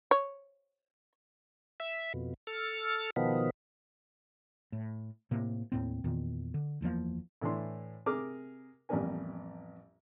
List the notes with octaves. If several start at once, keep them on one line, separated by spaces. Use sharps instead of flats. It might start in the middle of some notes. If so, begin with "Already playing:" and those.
C#5
E5
F2 B2
A4 F6
B2 D#3 F3 B3
A2
A2 C3 A#3
D#2 A2 C4
E2 A#2 D#3
D3
F#1 E2 F3 A#3
A2 E3 D4 C6
C3 G#4 A#4 D6 F6
A1 F2 G3 B3 A#4 G#5